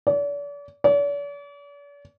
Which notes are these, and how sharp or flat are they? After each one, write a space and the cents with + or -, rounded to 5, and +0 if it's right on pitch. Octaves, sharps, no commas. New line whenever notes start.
D5 -40
D5 -45